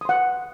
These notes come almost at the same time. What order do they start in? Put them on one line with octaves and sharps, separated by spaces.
D#6 C6 F#5